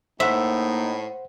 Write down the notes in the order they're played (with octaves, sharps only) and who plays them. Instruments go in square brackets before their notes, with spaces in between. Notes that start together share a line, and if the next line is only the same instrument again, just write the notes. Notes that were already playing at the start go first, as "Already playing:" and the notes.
[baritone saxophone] A2 [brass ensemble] A#3 D#4 [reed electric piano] C5 F#5 [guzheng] E5